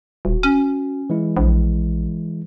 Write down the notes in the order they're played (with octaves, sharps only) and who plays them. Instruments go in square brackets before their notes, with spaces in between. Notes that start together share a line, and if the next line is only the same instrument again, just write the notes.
[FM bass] D#1 [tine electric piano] F#4
[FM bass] C#4
[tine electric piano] E3 G#3 E4
[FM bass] A#1